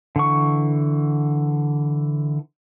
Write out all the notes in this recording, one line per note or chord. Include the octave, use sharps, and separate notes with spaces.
D3 E3 C#6